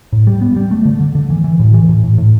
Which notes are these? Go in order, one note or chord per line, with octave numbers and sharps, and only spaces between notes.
A2
G3
B3
G3
A3
D3
D3
D3
E3
E3
A2
E3
A2
A2
A2